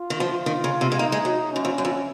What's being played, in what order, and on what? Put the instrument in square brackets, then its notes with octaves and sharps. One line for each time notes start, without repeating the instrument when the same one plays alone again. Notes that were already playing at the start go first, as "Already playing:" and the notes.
Already playing: [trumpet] F4
[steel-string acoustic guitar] D#3
F3
D#3
C#3
C3
G#3
[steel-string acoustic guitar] A#3 [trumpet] D#4
[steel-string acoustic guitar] G#3
F#3
[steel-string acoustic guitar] F#2 [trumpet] C#4
[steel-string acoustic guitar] F2
F#2
F2